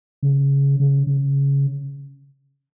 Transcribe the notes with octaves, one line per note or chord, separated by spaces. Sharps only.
C#3
C#3
C#3